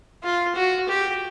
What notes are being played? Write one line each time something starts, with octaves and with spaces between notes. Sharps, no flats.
F4
F#4
G4